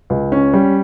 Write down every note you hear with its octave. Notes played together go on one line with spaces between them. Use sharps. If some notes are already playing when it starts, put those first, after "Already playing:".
C#2
C#4
G3